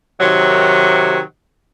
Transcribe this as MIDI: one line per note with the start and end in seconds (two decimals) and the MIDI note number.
0.21 1.20 48
0.21 1.20 51
0.21 1.20 54